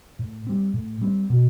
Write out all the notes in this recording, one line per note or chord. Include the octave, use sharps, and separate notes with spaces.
A2
G3 C4
A2
G3 C4
B2